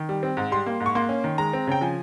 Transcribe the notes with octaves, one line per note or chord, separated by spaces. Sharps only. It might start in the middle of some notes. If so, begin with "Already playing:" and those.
Already playing: D#3
G3
C4
G#2
G3 C6
A#3
G#2
C#6
A#3 C6
C#4
D#3
G#3 A#5
C4
C#3 G5
F3 G#5